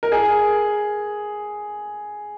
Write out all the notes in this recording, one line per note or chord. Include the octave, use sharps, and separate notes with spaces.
A#4
G#4